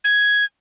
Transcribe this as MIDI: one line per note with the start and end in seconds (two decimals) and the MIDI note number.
0.04 0.45 92